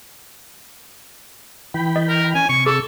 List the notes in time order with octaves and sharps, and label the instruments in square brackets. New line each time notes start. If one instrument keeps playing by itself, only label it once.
[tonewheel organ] E3 G5 B5
[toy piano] D#5
[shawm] A#4
[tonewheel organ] C#4 [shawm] G#5
[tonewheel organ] C3 [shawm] C#6
[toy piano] G#4 [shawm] A4